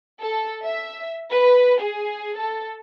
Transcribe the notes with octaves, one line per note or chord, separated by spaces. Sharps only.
A4
E5
B4
G#4
A4